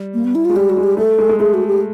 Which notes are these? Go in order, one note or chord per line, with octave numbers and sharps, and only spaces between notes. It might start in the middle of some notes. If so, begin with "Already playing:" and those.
Already playing: G3
A#3
B3
E4
G#3 F4
G3 G4
F#4
G#3
G4
A3 A4
G#3
G#3
A3 G#4
F#4
G4